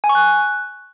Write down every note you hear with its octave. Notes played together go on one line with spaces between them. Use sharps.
G#5
C#6
F#6